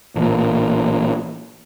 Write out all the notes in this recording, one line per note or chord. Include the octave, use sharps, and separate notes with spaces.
A1 A#2